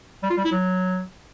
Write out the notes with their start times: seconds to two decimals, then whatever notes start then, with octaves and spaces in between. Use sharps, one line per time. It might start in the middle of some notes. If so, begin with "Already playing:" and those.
0.23 G3
0.30 F4
0.37 G3
0.45 E4
0.52 F#3